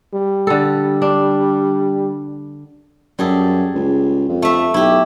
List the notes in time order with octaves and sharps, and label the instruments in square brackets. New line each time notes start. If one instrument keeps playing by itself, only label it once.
[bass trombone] G3
[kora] D3 A4
D4
[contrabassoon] F#2 [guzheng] G3 G#4 A4
[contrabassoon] C#2
F2
[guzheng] A3 E5
[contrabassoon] B1 [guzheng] E4 G4